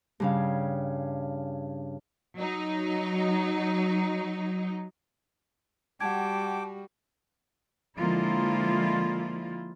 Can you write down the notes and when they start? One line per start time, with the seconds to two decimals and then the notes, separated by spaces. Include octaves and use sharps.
0.20 G2 C#3 F5
2.38 F#3 D#4
6.00 G3 F#4 F#5 G5 A5 D6 G#6
7.98 D3 F3 G#3 A#3 E4 F4